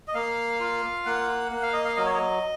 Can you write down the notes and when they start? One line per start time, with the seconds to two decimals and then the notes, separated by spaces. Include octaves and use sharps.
0.08 D#5
0.15 A#3 F5
0.60 F4
1.05 A#3 F#5
1.52 A#3 F#5
1.63 F5
1.73 D#5
1.85 F5
1.97 F#3 D#5
2.06 C#5
2.14 D#5